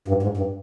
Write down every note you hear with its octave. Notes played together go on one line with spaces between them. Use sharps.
G2
G#2
G2